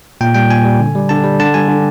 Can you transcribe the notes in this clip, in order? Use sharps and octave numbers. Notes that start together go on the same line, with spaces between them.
A#2 G5
G3 G5
A#2 G#5
G3
D3
G3
D3 A5
G3
D3 A5
G3 G#5
D3